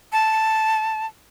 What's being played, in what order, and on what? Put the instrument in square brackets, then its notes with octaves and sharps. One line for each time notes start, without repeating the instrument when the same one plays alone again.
[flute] A5